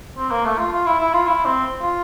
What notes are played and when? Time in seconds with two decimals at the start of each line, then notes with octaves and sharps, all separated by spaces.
0.18 C4
0.31 A#3
0.45 A3
0.58 F4
0.72 F4
0.86 E4
1.00 E4
1.13 F4
1.27 E4
1.46 C4
1.82 F4